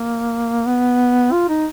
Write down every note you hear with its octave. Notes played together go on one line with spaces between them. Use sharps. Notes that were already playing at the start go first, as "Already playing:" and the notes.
Already playing: A#3
B3
F4
D#4